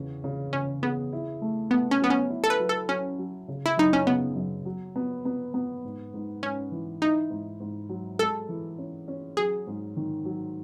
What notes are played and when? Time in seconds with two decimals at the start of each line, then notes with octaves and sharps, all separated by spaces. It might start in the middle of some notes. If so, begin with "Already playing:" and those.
Already playing: E2 C#3 C#4
0.24 C#3
0.53 C#3 C#4
0.83 B3 G#4
1.13 E4
1.42 A3
1.71 A3 B3
1.91 C#4
2.01 F#3 B3
2.10 C#4
2.30 E4
2.44 A4
2.50 B4
2.60 F#3
2.69 A4
2.89 F#3 C#4
3.19 F#3
3.48 C#3
3.66 E4
3.77 F#2 D#4
3.93 C#4
4.07 C#3 B3
4.36 F#2
4.65 F#3
4.96 B3
5.25 B3
5.54 B3
5.84 G#2
6.14 G#2
6.43 G#2 C#4
6.71 E3
7.02 D#4 E4
7.30 G#2
7.60 G#2
7.89 F#3
8.19 G#3 A4
8.49 E3
8.78 C#4
9.08 C#4
9.37 F#3 G#4
9.67 G#2
9.97 D#3
10.25 F#3